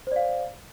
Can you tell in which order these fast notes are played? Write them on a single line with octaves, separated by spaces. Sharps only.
C5 D5 F5